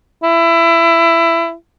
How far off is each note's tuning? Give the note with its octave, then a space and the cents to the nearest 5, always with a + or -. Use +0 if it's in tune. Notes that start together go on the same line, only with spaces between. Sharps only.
E4 +20